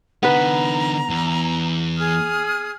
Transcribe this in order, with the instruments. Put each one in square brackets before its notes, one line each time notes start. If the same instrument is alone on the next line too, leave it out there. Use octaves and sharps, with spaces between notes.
[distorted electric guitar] D3 D#4 [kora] B3 B4 [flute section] A#5
[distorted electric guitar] E2
[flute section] G#4 D#6 F6